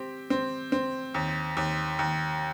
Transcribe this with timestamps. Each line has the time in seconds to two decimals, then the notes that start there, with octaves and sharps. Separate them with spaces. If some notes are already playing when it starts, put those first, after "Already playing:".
Already playing: C4 G4
0.30 C4
0.72 C4
1.14 D#2
1.57 D#2
1.99 D#2